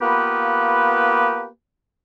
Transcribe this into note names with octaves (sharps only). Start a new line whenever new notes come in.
A#3 B3 F4 G4 B4